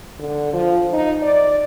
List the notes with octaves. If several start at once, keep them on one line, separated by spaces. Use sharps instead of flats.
D3
F3
D#4
D5